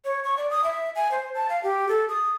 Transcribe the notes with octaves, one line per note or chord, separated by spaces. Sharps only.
C#5
C#6
D5
D#6
E5
G#5
C5
A5
F5
G4
A4
D#6